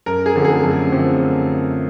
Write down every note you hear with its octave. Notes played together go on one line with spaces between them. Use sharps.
F#2 A#4
G#4
D3 F3 A3 C4
G#4
F#2
D3 F3 A3 C4